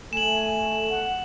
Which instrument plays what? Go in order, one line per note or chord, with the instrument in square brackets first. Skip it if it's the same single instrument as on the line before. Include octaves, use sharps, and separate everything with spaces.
[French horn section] A3 [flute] G#5 [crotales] E7 F#7
[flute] F#5